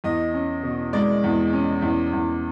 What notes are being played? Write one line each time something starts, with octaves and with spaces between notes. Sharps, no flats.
E2 D#5
C#4
B2
G#3 D5
E2
C#4
E2
E2